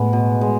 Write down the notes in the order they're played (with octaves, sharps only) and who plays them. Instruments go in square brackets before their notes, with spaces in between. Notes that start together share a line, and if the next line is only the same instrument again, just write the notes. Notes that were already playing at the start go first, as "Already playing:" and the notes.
Already playing: [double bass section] A2 [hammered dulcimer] G#3 B3
[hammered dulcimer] B2
G#3